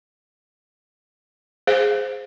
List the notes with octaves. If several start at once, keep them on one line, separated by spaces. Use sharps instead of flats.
G#4 C5 F5